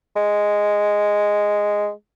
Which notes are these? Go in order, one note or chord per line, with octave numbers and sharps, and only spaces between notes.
G#3